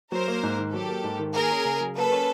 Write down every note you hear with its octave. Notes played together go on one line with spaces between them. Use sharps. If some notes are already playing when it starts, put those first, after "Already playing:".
F#3 A#4 C5
A#3
G#2
D#3
F#3 G4 A4
A#3
G#2
D#3
A#3 G#4 A#4
C#4
C#3
F#3
A#3 A4 B4
C#4